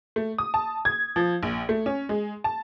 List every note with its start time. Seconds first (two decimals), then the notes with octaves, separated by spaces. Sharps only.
0.16 A3
0.38 D#6
0.54 A5
0.85 G#6
1.16 F3
1.43 A#1
1.69 A3
1.86 C#4
2.09 G#3
2.44 A5